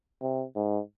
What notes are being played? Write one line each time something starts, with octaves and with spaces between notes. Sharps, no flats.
C3
G#2